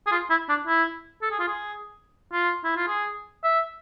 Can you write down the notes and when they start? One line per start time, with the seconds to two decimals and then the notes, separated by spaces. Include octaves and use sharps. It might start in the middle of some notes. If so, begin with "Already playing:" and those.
0.07 G#4
0.12 F4
0.30 E4
0.49 D4
0.67 E4
1.22 A4
1.31 G#4
1.40 F4
1.48 G#4
2.33 F4
2.64 E4
2.76 F4
2.88 G#4
3.44 E5